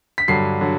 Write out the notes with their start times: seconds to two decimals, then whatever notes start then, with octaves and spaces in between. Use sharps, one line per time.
0.18 B6
0.28 G2 D3 F#3 C7
0.61 D3 F#3